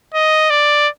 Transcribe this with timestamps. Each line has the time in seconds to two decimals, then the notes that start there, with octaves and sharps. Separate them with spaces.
0.14 D#5
0.50 D5